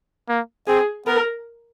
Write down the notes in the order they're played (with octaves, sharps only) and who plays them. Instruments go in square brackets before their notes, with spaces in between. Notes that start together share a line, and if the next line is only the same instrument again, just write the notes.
[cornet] A#3
[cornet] C4 [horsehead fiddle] G#4
[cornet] B3 [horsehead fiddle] A#4